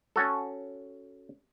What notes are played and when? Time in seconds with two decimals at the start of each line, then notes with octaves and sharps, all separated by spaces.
0.16 C#4 F#4 A4